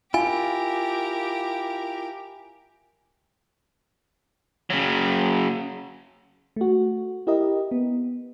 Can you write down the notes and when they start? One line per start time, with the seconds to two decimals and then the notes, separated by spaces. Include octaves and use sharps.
0.14 E4 F4 G4 A#4 G#5
4.70 C#3 F#3
6.56 A3 F#4
7.27 E4 G4 A#4 D#5
7.71 B3